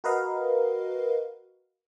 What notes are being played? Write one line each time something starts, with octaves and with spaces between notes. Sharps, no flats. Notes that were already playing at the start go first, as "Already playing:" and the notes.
F#4 A#4 B4 D#5 F5